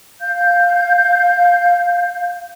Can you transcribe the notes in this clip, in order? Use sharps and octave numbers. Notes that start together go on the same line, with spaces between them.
F5 G6